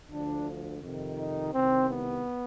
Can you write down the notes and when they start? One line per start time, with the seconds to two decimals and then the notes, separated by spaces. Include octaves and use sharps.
0.10 D2 D3 F3 D4
0.81 F2 C3 D#3
1.17 D#4
1.52 C2 C3 D#3 C4
1.88 B3